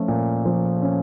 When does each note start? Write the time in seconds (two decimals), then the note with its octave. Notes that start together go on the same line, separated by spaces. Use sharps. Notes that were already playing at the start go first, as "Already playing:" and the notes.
Already playing: F3 A3 C#4
0.08 A#2
0.45 F3
0.82 C#4